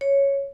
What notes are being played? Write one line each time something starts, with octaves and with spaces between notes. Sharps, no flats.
C#5